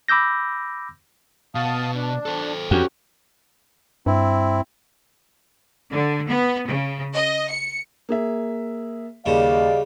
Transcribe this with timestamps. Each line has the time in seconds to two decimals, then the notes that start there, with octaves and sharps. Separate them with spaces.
0.08 B5 D6 E6 G6 A#6
1.55 B2 F5 A5 D#6
1.95 D4
2.26 A4 C5
2.71 F2 C#4 F#4 G4
4.06 G2 C4 E4
5.91 D3
6.27 B3
6.67 C#3
7.14 D#5
7.50 C#7
8.09 A#3 G#4 E5
9.26 D#2 C#3 G3 D5 D#5 F5